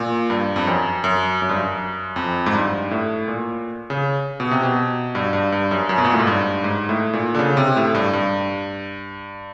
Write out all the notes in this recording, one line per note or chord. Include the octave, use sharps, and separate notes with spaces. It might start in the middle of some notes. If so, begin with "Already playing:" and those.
Already playing: A#2
G2
F2
F#2
F#2
F#2
G2
F#2
F2
G#2
G2
A2
A#2
C#3
B2
C3
B2
G2
G2
G2
F#2
F#2
B2
A#2
A2
G#2
G2
G#2
A2
A#2
D3
C#3
C3
A2
G2
G2